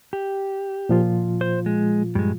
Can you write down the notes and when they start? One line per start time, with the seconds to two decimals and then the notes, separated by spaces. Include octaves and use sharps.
0.13 G4
0.89 A#2 F3 F4
1.41 C5
1.66 G#3
2.15 G2 G#3